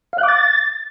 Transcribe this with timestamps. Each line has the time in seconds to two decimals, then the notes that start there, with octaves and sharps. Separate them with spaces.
0.13 F5
0.18 F#6
0.23 D6
0.28 A6